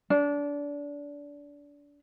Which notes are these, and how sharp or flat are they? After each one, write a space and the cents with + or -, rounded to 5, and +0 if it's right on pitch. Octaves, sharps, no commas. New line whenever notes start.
D4 -25